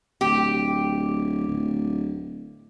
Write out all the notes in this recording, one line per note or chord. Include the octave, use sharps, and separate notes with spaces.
D1 G4
D1